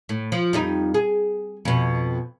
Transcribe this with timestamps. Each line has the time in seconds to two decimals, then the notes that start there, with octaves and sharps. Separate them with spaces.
0.09 A2
0.32 F3
0.53 F2 G3 D#4
0.94 G#4
1.65 F2 B2